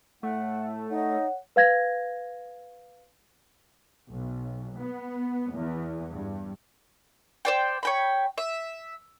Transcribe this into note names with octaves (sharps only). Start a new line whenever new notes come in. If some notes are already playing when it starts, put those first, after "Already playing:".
A2 A3 F#5
D#4 C#5 F#5
B4 F5 G#6 A#6
B1
B3
E2
G2
C5 D5 G5
C#5 G5 B5
E5